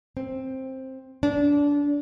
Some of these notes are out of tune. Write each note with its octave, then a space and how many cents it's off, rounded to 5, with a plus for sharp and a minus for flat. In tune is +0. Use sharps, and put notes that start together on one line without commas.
C4 +10
D4 -25